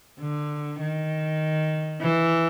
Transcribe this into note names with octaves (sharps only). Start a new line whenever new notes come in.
D3
D#3
E3